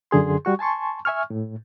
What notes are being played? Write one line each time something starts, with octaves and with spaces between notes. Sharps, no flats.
F#2 D3 G#4 C6
G3 F#4 C#6
G#5 A5 C6 C#6
E5 G#5 C#6 F6
A2